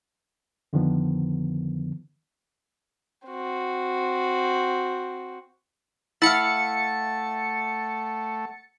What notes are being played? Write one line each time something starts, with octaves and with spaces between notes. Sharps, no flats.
F2 D3 D#3 F3 B3
C4 F#4
A3 E4 F5 F#5 A6 C#7